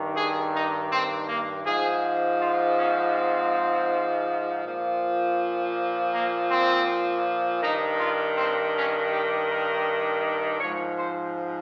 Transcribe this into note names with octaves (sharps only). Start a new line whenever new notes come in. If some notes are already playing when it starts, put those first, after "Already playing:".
Already playing: G2 D#3
G#4
D#4
C4
A#3
G#2 F3 G#4
F4
C#4
C4
A#2 F3
A#3
C4
G2 D#3 D#4
F4
C4
C#4
G4
A#4
G#2 F3 C#5
C5